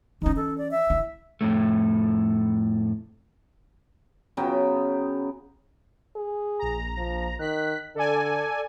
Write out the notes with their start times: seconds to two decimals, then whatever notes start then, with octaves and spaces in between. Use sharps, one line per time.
0.22 E3 C#4 D#4
0.36 A4
0.58 D5
0.71 E5
0.90 E4
1.41 F2 A2 A3
4.37 C#3 F#3 B3 G5
6.16 G#4
6.59 A#1 A#5
6.97 F3
7.39 D#3 F#6 B6
7.95 D3 A4 D5 G#5